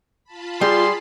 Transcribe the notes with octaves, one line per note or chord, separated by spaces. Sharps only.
F4 A5 B5
G3 G#4 C6